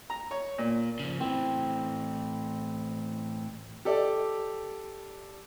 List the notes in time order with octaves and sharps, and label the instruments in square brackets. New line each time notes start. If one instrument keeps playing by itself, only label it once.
[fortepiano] A#5
C#5
A#2
[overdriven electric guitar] C#3 F3
[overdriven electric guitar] A2 E3 [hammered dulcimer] C4
[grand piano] G4 A4 D5